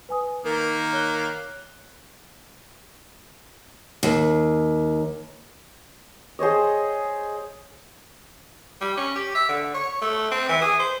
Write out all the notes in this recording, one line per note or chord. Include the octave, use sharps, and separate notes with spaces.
B4 G#5 D#6
D#3 A#3 A#4
C#5 F#6 G7
D#2
G#4 C5 C#5 D#5
G3
C#4
G4
E5
D3
C#5
A3
C4
E3
G#4
C5